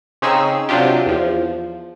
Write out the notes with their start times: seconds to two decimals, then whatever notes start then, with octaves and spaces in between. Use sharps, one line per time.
0.22 C#3 C4 C#4 D#4 G#4 E6
0.69 C3 F#3 D4 F4 G4
1.06 E2 F3